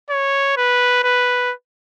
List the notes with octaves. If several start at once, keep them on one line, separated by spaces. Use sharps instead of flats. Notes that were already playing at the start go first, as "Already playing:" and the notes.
C#5
B4
B4